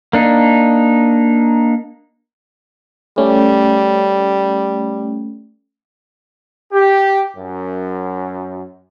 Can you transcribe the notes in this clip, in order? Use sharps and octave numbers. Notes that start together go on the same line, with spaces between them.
A#3 D4 D#4
G3 A3 C#4
G4
F#2